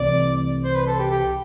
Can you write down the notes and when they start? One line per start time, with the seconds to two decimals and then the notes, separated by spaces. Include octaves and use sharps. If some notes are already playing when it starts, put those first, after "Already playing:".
Already playing: C2 C3 E3 A3 D5
0.64 C5
0.75 B4
0.87 A4
0.99 G4
1.11 G4